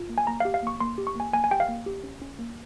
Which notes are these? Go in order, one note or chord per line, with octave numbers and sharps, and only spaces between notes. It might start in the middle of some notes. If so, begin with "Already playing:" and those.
Already playing: F4
A#3
G#5
A#3 A#5
G4 F5
F5
A#3 C#6
A#3 C6
G4
C#6
A#3 G#5
A#3 G#5
G#5
G4 G5
F5
A#3
G4
C#4
C#4
A#3